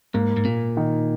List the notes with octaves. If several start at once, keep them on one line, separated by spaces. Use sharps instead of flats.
G#2 A#3
G#2
A#2 A#3
D#3